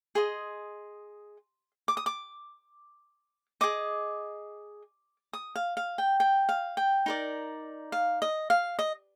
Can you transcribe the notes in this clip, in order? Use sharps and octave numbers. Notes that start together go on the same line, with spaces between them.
G#4 D#5 C6
D6
D#6
D6
G#4 D#5 D6
D#6
F5
F5
G5
G5
F5
G5
D#4 A#4 D5
F5
D#5
F5
D#5